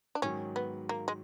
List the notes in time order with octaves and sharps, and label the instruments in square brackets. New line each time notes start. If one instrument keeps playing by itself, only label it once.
[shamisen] D4
[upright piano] G#2 D#3 F#3 [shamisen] C#4
[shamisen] B3
A#3
G#3